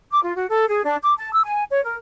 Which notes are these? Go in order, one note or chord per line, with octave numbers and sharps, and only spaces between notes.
D6
F4
F#4
A4
G#4
D4
D6
A5
E6
G#5
C#5
A#4